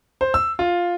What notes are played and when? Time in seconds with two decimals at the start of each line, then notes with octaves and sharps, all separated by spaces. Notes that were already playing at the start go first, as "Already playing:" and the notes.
0.21 C5
0.34 E6
0.59 F4